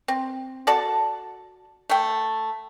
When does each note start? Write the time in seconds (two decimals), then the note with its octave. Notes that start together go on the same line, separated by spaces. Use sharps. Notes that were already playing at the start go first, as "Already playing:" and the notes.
0.08 C4
0.67 F#4 A4 D5 A5
1.90 A3 G5